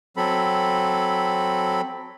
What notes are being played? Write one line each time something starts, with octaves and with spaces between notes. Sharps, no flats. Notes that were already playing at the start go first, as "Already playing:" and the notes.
F#3 C4 A4 B5